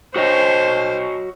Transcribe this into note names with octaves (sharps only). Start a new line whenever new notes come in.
F#4 C5 C#5 D#5